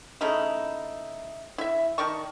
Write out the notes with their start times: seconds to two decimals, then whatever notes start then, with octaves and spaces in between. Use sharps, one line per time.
0.21 C#3 A3 D#4 E4
1.58 E4 E5
1.98 D#3 D5 A5 C#6